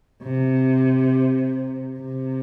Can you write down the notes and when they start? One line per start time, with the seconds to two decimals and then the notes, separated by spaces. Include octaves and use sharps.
0.23 C3
1.99 C3